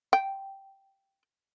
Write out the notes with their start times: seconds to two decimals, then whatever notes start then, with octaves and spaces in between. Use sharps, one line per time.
0.13 G5